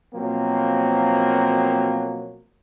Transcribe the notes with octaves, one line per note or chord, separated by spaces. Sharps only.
B2 F3 F#3 A#3 C4